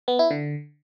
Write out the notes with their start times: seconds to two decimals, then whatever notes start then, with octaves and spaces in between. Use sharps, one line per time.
0.08 B3
0.19 E4
0.31 D3